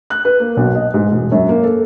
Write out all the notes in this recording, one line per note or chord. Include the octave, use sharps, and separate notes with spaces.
F#6
B4
A#3
B1
D#5
G#2
E1
F#2
A#3
A4